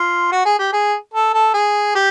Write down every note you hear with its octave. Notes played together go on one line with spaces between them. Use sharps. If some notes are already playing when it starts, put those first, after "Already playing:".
Already playing: F4
F#4
G#4
G4
G#4
A4
A4
G#4
G4